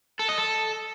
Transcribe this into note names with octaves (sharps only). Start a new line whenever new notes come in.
A4
D#5
A4